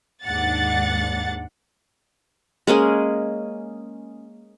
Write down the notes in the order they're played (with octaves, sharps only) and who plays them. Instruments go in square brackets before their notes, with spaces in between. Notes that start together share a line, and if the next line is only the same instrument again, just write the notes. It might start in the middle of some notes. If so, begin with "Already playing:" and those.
[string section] D#2 G#2 D4 F#5 A6
[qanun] G#3 A#3 C#4 G#4